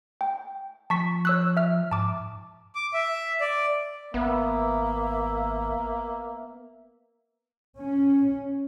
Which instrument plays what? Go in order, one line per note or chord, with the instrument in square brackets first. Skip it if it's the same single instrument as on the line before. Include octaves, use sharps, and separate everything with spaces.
[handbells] G5
[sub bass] F3 [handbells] A5 C#6 B6
[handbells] C#5 E6 F#6
E5 F6
[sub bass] G#2 [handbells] A5 D6
[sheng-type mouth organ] D6
E5
D5
[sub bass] G#1 [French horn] A#3 [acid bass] B3 [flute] E5
[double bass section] C#4